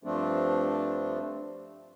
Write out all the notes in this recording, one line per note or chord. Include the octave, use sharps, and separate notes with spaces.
G2 F3 A3 C4 D4